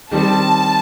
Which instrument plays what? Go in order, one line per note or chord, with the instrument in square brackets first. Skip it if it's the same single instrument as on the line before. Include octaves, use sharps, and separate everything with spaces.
[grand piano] D#3 G3 C4 [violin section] A5